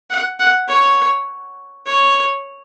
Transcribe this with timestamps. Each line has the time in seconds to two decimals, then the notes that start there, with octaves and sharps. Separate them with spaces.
0.10 F#5
0.39 F#5
0.68 C#5
1.86 C#5